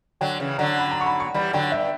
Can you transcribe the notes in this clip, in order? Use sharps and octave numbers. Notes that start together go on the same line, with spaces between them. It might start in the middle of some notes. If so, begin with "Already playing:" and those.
D3 F#3 G5
C#3 E3
D3 F#3 A#5
B5
A#5
C#6
B5
C#6
E3 G3 B5
D3 F#3 G5
G2 E5